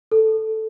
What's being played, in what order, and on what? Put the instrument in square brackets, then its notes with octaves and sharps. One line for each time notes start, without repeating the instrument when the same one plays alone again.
[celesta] A4